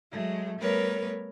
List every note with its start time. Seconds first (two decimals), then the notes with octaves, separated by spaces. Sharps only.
0.11 F#3 G#3 A3
0.59 G3 A3 B3 A#4 B4 C#5